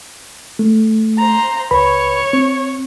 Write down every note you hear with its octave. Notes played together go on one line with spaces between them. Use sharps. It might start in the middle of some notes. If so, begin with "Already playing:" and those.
A3
C5 A#5
C#2 B4 C#5 B5
C4